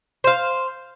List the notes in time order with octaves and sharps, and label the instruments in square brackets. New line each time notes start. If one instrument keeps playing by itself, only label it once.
[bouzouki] C5 F5